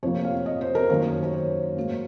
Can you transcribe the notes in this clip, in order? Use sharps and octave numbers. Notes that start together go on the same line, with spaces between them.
F2 C3 F3 A#3 C#5
F5
D#5
C5
A#4
F#2 D#3 A#3 C#5
C#5
C5
G#2 F#3 A#3